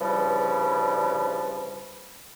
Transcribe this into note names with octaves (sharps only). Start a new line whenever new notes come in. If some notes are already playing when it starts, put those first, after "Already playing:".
G2 C#3 E3 F3 G3